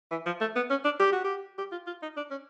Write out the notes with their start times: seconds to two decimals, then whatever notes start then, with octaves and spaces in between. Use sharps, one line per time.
0.11 E3
0.26 F3
0.41 A3
0.56 B3
0.70 C#4
0.84 D4
1.00 G4
1.12 F#4
1.24 G4
1.58 G4
1.72 F4
1.87 F4
2.02 D#4
2.17 D4
2.31 C#4